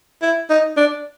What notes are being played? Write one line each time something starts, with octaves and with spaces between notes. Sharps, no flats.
E4
D#4
D4